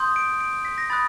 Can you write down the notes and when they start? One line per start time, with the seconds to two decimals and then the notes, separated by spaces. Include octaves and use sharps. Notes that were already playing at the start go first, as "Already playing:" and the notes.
Already playing: C6 D#6 G6
0.16 D7
0.41 D7
0.65 B6
0.78 A#6
0.90 B5 D#6 F#6 A6